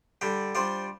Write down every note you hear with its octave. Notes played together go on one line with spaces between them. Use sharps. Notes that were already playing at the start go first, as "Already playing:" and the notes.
D3 G3 D4 G4
G3 D4 F4 C5